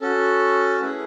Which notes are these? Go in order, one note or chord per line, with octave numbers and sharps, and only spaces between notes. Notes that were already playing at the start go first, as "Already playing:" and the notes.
C#4 F#4 A4
A3 C#4 E4 G#4 B4